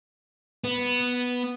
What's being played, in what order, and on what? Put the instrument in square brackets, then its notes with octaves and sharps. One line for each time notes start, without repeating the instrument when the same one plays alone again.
[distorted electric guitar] B3